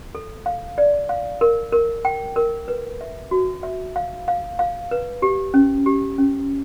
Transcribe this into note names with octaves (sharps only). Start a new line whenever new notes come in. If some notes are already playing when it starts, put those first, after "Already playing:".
A4
F5
D5
F5
A#4
A#4
G5
A#4
B4
E5
F#4
E5
F5
F5
F5
B4
G4
C#4
G4
C#4